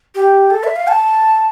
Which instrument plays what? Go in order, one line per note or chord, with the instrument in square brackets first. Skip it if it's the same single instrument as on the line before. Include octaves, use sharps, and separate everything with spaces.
[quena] G4
A4
E5
F5
A5